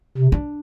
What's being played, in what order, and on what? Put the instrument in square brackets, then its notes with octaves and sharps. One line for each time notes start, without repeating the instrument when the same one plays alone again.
[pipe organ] C3
[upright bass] D4